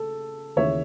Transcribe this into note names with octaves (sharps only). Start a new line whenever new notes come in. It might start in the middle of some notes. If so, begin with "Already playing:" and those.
Already playing: C#3 A4
D#2 C#3 E3 C#5 E5